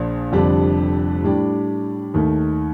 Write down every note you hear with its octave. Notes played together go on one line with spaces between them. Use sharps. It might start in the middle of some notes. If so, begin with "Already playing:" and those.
Already playing: A#1 A#2 F3
F1 F2 D3 G3 D4
A2 G3 D4 G4
D#2 D#3 A3